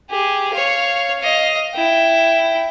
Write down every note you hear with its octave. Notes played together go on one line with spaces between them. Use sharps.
G4 G#4
C#5 F5
D#5 F5
E4 G5